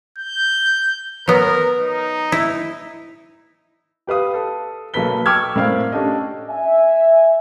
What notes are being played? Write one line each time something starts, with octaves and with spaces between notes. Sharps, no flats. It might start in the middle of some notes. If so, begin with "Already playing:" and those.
G6
F#3 B3 A#4
D#4
E4
G4 B4 F5 D#6
A4
B1 A#3 A4 B4 B6 G7
G5 C#6 D6 E6 F6 G#6
A2 C4 A#4 D5 F5 F6
C#4 D4 G4 A4 D#5
E5 G#5